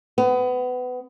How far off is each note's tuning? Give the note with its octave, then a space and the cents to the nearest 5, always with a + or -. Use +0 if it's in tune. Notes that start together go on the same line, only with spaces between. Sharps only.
B3 +25